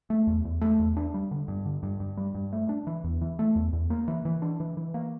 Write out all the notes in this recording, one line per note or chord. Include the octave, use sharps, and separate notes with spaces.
A3
E2
E2
A3
E2
D4
G3
D3
G2
D3
G2
G2
G3
G2
A3
D4
E3
E2
E3
A3
E2
E2
A#3
E3
E3
D4
E3
E3
A#3